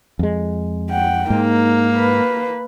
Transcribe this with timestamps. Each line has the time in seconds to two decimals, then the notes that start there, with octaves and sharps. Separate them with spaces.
0.19 F2 G#3
0.90 F#5 G5
1.30 G#2 A#3 D#4
1.94 B4